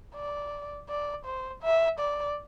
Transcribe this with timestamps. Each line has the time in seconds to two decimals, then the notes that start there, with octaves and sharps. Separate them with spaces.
0.15 D5
0.89 D5
1.25 C5
1.62 E5
1.99 D5